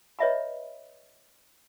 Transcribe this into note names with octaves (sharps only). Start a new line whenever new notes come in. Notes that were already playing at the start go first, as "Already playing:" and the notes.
B4 C#5 D#5 E5 A#5 B5